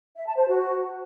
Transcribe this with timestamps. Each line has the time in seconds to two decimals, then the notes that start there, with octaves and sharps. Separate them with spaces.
0.16 E5
0.26 A5
0.37 C5
0.47 F#4